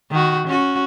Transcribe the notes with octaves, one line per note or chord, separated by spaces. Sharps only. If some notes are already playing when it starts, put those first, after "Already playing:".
D#3 F#4
C#4 F#4